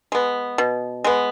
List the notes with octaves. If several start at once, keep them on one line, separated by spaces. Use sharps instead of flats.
G#3 B3
B2
G#3 B3